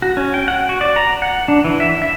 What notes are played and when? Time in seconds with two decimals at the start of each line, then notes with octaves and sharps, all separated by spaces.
0.02 F#4
0.17 C#4
0.34 G5
0.48 F#5
0.69 F#4
0.81 D5
0.96 A#5
1.22 F#5
1.48 D4
1.65 E3
1.80 E5
2.02 E5